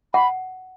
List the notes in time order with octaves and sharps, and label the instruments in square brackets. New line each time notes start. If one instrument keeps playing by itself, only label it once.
[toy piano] F#5 [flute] B5